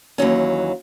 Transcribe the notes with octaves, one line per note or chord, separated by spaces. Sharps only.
D#2 E3 F#3 C#4